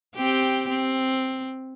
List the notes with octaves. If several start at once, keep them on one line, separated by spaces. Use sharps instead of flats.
C4 G4
C4